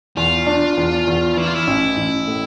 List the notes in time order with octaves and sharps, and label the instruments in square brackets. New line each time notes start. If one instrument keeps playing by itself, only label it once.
[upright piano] E2 [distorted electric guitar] F4
[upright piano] D4
E2
E2
[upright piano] E3 [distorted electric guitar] E4
[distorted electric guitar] F4
E4
[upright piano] A1
A1
A2